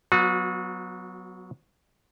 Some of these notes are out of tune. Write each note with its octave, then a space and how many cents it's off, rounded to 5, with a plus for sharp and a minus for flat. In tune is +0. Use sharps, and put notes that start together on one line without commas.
F#3 +0 B3 +0 F#4 -40